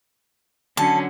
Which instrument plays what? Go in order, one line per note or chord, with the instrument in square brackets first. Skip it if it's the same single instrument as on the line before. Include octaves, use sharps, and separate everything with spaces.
[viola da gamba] D3 F#3 C#4 [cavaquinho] A5